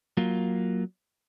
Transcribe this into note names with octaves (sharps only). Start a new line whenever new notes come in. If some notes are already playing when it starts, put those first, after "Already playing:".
F#3 A#3 F4